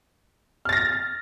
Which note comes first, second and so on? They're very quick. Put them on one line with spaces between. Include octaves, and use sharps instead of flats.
F6 A6 A#6